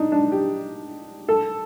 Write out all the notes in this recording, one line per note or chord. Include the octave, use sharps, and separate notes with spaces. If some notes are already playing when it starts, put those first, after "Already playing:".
Already playing: D4 D#4
D4
G4
A4